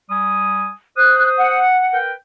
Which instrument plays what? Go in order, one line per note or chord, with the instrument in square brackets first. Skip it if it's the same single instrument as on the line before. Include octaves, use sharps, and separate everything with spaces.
[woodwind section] G3 G#5 D#6
[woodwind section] C5 D#6 [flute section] F#6
[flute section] F#5
[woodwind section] A#4 B4 G5